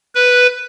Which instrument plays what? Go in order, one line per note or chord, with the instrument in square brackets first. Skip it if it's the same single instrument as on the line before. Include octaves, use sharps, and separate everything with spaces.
[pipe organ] B4